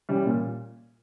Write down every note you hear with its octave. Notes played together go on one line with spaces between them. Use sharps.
E3 G3 C#4
A#2